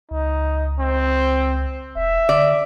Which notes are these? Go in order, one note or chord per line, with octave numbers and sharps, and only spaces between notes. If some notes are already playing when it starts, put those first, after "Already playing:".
C#2 D#4
C4
E1 E5
D3 D5